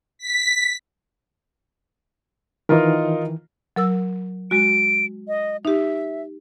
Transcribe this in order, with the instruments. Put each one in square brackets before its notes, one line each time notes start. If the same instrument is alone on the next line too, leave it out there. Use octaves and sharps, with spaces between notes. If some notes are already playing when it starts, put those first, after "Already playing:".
[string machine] B6
[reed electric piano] D#3 E3 [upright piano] D#4 F4 A#4
[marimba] F#3 A#4 E6
[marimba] G#3 F#4 [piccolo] D7
[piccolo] D#5
[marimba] D#4 G4 [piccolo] E5